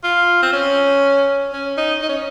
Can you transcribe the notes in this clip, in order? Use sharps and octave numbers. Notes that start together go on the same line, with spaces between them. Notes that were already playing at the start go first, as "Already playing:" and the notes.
F4
C4
C#4
C#4
D#4
D#4
C#4